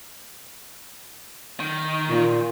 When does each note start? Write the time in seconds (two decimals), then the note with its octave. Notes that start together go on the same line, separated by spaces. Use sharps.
1.60 D#3
2.09 A#2